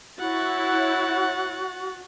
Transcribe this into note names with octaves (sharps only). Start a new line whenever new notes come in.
E4 F#4 C#5 F#5 A6